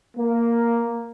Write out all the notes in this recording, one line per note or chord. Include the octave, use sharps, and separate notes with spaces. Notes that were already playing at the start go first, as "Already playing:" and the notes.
A#3